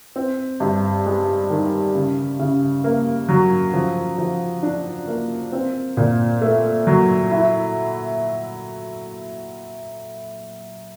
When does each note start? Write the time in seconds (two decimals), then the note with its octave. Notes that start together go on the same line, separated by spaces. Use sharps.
0.16 C4
0.60 G2
1.06 G#3
1.50 D#3
1.95 C#3
2.39 C#3
2.84 A#3
3.29 F#3
3.74 F3
4.18 F3
4.63 D4
5.08 A#3
5.53 C4
5.97 A#2
6.41 A3
6.87 F#3
7.31 E4